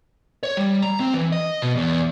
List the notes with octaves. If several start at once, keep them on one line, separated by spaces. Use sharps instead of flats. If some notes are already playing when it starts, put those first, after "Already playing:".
C#5
G3
A#5
C4
E3
D#5
B2
E2